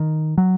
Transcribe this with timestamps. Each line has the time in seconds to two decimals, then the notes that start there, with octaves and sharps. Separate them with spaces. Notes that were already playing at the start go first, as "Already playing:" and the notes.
Already playing: D#3
0.38 F#3